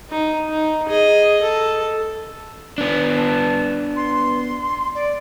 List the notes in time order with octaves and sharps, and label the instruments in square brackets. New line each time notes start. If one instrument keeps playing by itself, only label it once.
[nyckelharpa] D#4
D#4
G#4 D#5
A4
[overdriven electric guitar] B3 D4
[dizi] A5
C6
D5